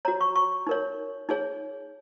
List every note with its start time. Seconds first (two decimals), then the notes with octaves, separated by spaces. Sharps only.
0.05 F#4 C#5 A#5
0.21 C#6
0.36 C#6
0.67 D#4 A#4 C#5
1.29 D#4 G#4 C#5